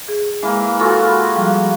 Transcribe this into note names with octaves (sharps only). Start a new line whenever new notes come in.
G#4
E3 G#3 A#3
F4 F#4 G#4 A4 F#5 E6
B5
F3 G3